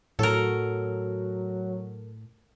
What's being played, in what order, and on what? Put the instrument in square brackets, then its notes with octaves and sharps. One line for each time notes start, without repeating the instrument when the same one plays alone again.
[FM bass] A2 [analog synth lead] F#3 [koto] A4 A#4